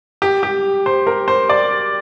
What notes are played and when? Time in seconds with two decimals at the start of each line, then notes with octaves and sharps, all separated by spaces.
0.22 G4
0.43 G4
0.86 C5
1.07 A#4
1.28 C5
1.50 D5